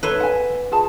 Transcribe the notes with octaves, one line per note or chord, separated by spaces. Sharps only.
D#4 A4 B4 C#5 E5 C6
F#5 G#5
F4 G#4 A5